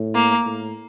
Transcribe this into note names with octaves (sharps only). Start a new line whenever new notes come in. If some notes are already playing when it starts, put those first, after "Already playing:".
Already playing: A2
A#3
A2